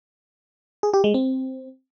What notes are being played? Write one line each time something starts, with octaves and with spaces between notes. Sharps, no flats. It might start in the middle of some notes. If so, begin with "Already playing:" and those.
G#4
G4
G#3
C4